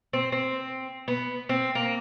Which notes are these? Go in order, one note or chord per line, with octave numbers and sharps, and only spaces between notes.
C4
C4
B3
C4
A#3